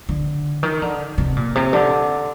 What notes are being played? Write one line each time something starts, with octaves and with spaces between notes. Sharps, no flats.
D3
D#3
D3
C3
A#2
C3
D3